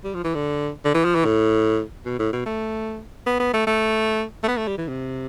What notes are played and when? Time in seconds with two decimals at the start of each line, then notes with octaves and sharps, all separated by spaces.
0.04 G3
0.14 F3
0.24 E3
0.35 D3
0.85 D3
0.95 E3
1.05 F3
1.15 E3
1.25 A2
2.05 B2
2.19 A2
2.33 B2
2.46 A3
3.26 B3
3.40 B3
3.54 A3
3.67 A3
4.43 A3
4.48 B3
4.58 A3
4.68 G3
4.78 E3
4.88 C3